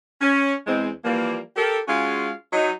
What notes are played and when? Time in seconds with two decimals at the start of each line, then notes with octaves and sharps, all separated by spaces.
0.21 C#4
0.67 E2 G#3 C4
1.04 E3 F3 G3 A#3
1.56 G4 A4 A#4
1.88 G#3 C#4 F4 F#4 G#4 F5
2.53 F#3 D#4